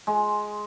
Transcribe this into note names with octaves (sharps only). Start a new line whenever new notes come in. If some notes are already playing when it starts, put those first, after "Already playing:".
G#3